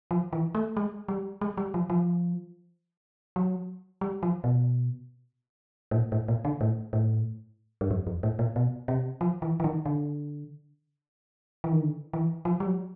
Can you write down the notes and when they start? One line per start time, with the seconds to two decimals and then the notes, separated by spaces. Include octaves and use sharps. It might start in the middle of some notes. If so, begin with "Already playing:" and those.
0.11 F3
0.33 E3
0.55 A3
0.77 G#3
1.08 G3
1.41 G#3
1.57 G3
1.74 F3
1.90 F3
3.36 F#3
4.01 G3
4.23 F3
4.44 B2
5.91 A2
5.95 A#2
6.12 A2
6.28 A#2
6.45 D3
6.61 A2
6.93 A2
7.81 G2
7.91 F#2
8.07 F2
8.23 A2
8.39 A#2
8.56 B2
8.88 C3
9.21 F3
9.42 E3
9.60 E3
9.64 D#3
9.86 D3
11.64 E3
11.72 D#3
11.81 D3
12.13 E3
12.45 F3
12.60 G3
12.66 F#3